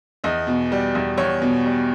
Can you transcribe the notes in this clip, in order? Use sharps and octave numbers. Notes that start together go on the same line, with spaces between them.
E2 D#5
B2
G3
E2
E2 C#5
B2
G3